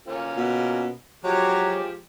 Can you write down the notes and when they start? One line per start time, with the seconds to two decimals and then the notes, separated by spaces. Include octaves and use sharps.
0.08 A#3 C#4 F4
0.36 B2
1.24 F3 F#3 G#3 G4 C#5